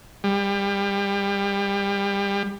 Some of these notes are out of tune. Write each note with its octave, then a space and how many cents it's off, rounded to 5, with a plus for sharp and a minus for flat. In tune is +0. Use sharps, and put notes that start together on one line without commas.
G3 +30